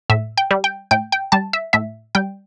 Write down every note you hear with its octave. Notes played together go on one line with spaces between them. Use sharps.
A2 E5
G5
G3
G5
A2 G5
G5
G3 A5
E5
A2 E5
G3 G5